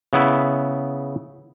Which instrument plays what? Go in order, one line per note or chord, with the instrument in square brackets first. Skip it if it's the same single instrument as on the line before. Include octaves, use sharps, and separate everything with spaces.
[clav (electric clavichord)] C#3 B3 E4